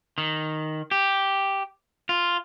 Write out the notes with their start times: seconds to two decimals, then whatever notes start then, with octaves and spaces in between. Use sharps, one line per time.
0.18 D#3
0.91 G4
2.09 F4